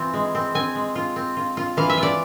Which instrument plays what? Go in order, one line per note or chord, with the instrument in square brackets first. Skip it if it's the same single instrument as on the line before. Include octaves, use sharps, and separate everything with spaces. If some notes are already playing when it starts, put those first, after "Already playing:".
Already playing: [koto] E3 C4 F4
G#3
C4
C4 G#5
G#3
F4
C4
F4
F4
E3 F5
E5
F4
D5